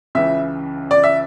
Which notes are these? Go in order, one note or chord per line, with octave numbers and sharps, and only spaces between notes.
C#2 C#3 E3 E5
D5
E5